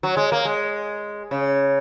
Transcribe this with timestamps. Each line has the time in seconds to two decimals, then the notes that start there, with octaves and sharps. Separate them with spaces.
0.03 F#3
0.17 G#3
0.32 A#3
0.45 G#3
1.31 C#3